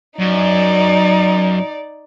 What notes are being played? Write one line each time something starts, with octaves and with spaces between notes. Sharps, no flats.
F#2 D#4 D5